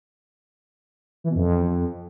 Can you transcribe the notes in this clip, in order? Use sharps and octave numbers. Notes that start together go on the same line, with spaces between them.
E3
B2
F2